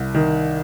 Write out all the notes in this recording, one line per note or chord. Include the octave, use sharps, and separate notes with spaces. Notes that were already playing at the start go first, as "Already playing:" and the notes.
Already playing: C2
D#3